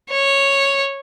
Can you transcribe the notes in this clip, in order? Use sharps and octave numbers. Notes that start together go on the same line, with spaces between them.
C#5